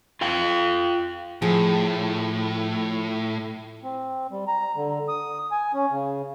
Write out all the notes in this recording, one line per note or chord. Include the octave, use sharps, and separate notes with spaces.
F4 F5 G5
A2 F3 G#4
C4
G3
A#5
D3
D#6
G#5
C#4
C#3